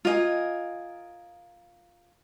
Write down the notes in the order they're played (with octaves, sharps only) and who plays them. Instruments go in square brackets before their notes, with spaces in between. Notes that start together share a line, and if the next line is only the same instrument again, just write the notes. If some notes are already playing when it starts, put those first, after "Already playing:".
[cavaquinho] F4 A#4 D#5 G#5